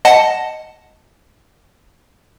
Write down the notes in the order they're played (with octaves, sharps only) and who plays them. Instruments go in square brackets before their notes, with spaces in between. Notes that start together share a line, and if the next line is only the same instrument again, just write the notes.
[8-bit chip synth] D#5 F#5 A5